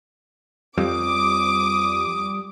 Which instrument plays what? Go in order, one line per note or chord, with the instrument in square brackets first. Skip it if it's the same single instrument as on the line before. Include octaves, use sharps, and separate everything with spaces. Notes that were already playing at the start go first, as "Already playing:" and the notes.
[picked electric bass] F2 [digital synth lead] G3 [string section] D6 [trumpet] D#6